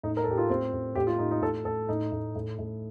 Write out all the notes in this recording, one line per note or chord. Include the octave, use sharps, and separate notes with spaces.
A2 D#4
A#4
A4
A2 G4
F4
A2 C4
A2
A2 G4
F4
A2 D#4
D#4
A2 A4
A2 A4
A2 D#4
A2
A2
A2